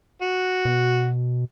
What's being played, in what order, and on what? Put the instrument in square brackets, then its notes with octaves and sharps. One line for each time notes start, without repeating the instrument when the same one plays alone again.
[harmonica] F#4
[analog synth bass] B2